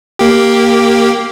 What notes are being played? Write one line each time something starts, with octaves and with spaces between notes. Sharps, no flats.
A#3 G4